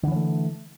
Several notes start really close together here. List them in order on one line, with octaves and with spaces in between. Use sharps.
D3 E3 C#4 A3